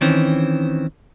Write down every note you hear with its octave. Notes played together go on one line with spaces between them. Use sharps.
D#3 E3 C4 C#4